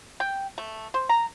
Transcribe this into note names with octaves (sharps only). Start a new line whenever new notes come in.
G5
A3
C5
A#5